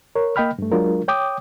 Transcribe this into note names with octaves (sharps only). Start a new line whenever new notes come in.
A#4 C#5
A#3 D#5 G5 B5 F6
G2 A3
F#3 G#3 D4 F4 A#4
C#5 G5 D6 D#6